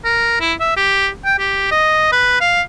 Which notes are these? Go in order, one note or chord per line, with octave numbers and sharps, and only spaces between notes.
A#4
E4
E5
G4
G5
G4
D#5
B4
F5